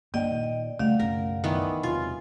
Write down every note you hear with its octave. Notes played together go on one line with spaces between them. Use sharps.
G1 C3 A#3 D4 D5 D#5 G5
A#2 D#3
C#3 G3 A3 A#3 D5 F5 F#5
B1 F#2 C#3 A#4
D#3 E3 B3
E1 C3 F#3 F4 G#5